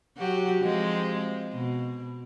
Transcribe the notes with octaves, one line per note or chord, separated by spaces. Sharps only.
F#3 F#4 G4
F3 G#3 C4
B2